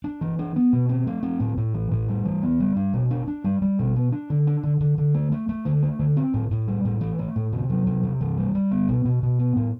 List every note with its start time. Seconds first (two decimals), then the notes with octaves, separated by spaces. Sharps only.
0.04 D4
0.21 E3
0.39 D4
0.56 B3
0.73 B2
0.89 C4
1.07 A3
1.23 C4
1.40 A2
1.57 A2
1.74 E3
1.91 A2
2.08 G3
2.25 E3
2.43 B3
2.60 G3
2.76 D4
2.94 B2
3.11 D4
3.28 D4
3.44 G3
3.62 G3
3.79 B2
3.96 B3
4.12 D4
4.30 D3
4.47 D4
4.64 D3
4.81 D3
4.98 D3
5.14 A3
5.32 A3
5.49 A3
5.65 D3
5.82 A3
5.99 D3
6.17 C4
6.34 A2
6.51 A2
6.68 G3
6.85 A2
7.01 E3
7.19 A3
7.36 A2
7.53 C3
7.70 F#3
7.87 C3
8.03 C3
8.21 E3
8.38 G3
8.55 G3
8.71 B3
8.89 B2
9.05 B2
9.23 B2
9.39 B3
9.56 A2